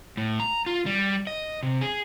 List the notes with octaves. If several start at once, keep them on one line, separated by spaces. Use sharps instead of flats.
A2
A#5
F4
G3
D#5
C3
G#4